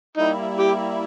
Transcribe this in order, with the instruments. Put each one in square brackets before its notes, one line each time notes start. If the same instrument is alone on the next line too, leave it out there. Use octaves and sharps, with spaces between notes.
[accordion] G3 A#3 E4 [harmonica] D#4
[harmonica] G4